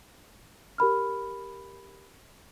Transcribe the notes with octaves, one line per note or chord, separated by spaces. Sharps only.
G4 A#4 B5 F6